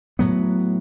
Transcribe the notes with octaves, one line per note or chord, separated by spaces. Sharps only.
A2 F#3 B3